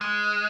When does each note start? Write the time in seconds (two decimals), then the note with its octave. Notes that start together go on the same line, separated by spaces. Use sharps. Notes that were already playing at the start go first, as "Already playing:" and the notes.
0.01 G#3